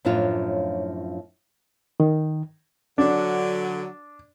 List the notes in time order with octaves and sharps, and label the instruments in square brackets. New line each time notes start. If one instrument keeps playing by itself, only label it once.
[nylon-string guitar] F#2 A2 F3 D4 F4 C#5
[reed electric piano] D#3
[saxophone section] D3 F#3 [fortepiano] D4